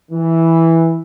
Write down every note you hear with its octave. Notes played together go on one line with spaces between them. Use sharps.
E3